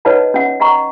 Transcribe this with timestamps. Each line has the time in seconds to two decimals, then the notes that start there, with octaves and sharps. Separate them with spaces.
0.05 D#4 B4 C#5 D#5 F#5 A5
0.34 C#4 F#5
0.60 D#5 F#5 G5 A#5 C#6